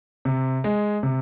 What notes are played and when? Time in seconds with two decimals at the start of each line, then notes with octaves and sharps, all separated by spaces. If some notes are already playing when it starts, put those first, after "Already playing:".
0.25 C3
0.64 G#3
1.03 C3